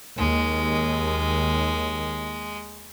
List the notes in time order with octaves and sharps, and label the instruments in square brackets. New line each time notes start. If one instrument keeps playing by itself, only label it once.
[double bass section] D#2 [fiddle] G#3